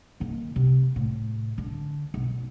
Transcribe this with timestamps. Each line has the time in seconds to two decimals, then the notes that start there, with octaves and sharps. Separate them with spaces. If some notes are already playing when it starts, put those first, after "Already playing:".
0.20 D#3 A#3
0.56 C3
0.96 A2
1.58 D3
2.14 B1